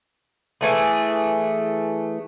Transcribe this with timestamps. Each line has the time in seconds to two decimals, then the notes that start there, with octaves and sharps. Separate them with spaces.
0.61 E3 A3 G#4